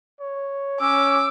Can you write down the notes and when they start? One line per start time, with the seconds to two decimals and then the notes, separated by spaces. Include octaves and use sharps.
0.20 C#5
0.80 C#4 D6 E6